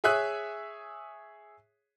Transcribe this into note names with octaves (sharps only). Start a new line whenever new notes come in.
G#4 C#5 E5 G#5 D#6 F#6